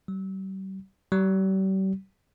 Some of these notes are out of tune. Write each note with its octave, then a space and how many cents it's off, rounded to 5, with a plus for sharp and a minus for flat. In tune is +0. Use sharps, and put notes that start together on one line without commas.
G3 -40
G3 -40